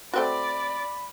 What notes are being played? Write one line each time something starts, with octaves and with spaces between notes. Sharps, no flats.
A3 C4 F#4 D5 B5